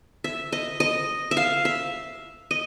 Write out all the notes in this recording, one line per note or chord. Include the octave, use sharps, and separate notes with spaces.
E5
D#5
D#5
E5
F5
E5
D#5